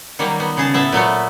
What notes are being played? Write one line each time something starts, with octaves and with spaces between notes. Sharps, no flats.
D#3 F#3 G3 A#3
B3
C#3 G#4 A5
A2 B3 E5 A5
A#2 F#3 A3 B3